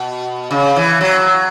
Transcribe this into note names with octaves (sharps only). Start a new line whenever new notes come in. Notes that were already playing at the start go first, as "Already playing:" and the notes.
Already playing: B2
C#3
E3
F#3